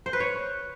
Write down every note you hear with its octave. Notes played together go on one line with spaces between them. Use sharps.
C5
B4
C#5